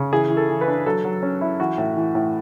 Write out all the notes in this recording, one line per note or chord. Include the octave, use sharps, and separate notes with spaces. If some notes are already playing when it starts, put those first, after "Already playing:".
Already playing: C#3
E3 G#4
E3
A4
E3
B4
D4
F#3 A4
F#3
C#4
E4
E3 F#4
A2
E3
A2